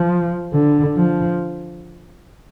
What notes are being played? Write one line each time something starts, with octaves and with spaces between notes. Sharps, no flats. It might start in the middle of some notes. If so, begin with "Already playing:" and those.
Already playing: F3
D3
F3